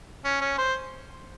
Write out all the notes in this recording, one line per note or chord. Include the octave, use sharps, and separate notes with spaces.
C#4
C#4
C5